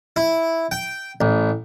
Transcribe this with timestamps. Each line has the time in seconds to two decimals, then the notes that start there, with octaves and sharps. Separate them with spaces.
0.16 E4
0.71 G5
1.21 A1